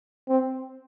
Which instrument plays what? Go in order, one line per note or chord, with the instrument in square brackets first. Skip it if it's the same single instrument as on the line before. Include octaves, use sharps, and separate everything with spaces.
[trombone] C4